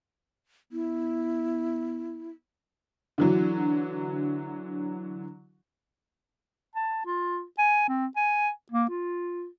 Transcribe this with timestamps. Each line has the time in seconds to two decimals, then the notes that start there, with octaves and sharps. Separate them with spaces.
0.72 B3 E4
3.18 D3 E3 F#3
6.75 A5
7.06 F4
7.58 G#5
7.88 C4
8.16 G#5
8.72 A#3
8.89 F4